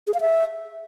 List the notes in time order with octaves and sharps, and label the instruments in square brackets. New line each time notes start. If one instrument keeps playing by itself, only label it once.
[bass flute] G#4
F5
E5